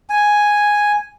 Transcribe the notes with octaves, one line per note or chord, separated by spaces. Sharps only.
G#5